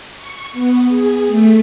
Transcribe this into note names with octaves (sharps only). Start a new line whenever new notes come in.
C#6
B3
G#4
A3